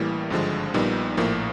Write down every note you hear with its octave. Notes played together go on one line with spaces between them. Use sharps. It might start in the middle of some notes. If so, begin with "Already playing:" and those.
Already playing: A1 A2 E3 G3 A#3
G#1 G2 D3 F3 G#3
A#1 A#2 G3 B3 D#4
A#1 A2 F3 A#3